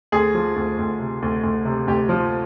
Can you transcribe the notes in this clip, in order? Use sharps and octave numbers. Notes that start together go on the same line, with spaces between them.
D2 G#4
F3
D2
D2
C3
D2
D2
C3
D2 G4
F3